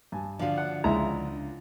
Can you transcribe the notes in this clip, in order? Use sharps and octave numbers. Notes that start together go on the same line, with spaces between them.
G2 G#5 A5
D3 F3 D4 F#4 F5
F#5
C#2 G#3 E4 A#5